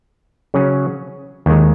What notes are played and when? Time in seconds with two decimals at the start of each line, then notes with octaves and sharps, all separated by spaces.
0.54 C#3 F#3 C#4 G#4
1.46 D#2 D#3 G#3